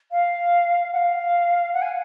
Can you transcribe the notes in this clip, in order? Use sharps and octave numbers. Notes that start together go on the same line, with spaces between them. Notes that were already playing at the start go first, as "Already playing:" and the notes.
F5
F#5
F5
F#5
G#5